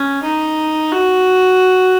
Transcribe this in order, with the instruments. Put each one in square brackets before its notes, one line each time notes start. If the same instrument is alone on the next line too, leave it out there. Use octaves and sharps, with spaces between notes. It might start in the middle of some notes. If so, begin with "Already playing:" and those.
Already playing: [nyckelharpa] C#4
D#4
F#4